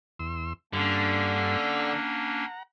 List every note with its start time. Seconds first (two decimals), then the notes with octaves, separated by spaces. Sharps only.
0.19 E2 C6 E6
0.73 G2 D3 A#3 C#4 D4
1.80 F#5 A#5